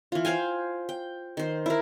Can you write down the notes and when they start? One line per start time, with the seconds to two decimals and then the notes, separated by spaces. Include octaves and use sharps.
0.12 E3 F4
0.25 C5 F5 G5 G#5
0.89 G5
1.37 D#3 C5
1.66 E4 A#4